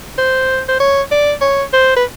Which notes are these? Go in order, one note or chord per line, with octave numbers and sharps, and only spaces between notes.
C5
C5
C#5
D5
C#5
C5
B4